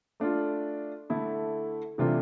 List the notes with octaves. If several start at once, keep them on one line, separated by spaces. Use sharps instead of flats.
A3 D4 F4
D3 A3 E4
C3 E3 A3 D4 F4